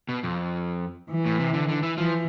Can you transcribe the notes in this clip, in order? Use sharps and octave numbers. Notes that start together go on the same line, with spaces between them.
B2
F2
E3
A2
C3
D3
D3
E3
E3 F3